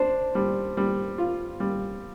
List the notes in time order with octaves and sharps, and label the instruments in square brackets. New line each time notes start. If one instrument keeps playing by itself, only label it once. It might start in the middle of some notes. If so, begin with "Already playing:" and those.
Already playing: [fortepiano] D4 [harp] C5
[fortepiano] G3
G3
F4
G3